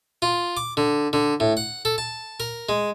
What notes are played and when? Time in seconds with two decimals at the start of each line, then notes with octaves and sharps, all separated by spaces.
0.22 F4
0.57 D6
0.77 D3
1.13 D3
1.40 A2
1.57 F#5
1.85 A4
1.98 A5
2.40 A#4
2.69 G#3